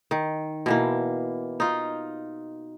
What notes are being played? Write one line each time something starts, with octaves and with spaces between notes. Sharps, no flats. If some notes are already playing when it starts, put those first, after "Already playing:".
D#3
B2 E3 A#3
D#4 F4